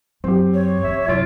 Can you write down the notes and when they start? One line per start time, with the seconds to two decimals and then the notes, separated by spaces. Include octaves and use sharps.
0.24 F#2 C4 G4
0.54 C#5
0.84 F2 C#3 E5
1.08 C2 F#2 F4 E6 D7